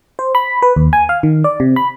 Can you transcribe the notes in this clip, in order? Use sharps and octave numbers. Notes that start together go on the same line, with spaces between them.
C5
B5
B4
D#2
G#5
F5
D#3
D5
C3
B5